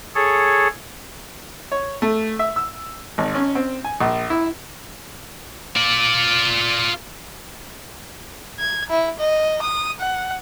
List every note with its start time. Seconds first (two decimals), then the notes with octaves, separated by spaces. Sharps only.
0.15 G#4 A4 C#5
1.72 C#5
2.02 A3
2.39 E5
2.56 E6
3.18 G#1
3.35 C#4
3.55 C4
3.85 G#5
4.01 A#1
4.30 E4
5.76 F4 D5
8.59 G#6
8.90 E4
9.19 D#5
9.62 D#6
10.00 F#5